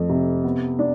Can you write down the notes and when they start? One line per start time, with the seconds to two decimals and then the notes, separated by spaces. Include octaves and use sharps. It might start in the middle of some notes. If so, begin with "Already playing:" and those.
Already playing: F2 F3 A3
0.10 C3
0.44 B3
0.79 D4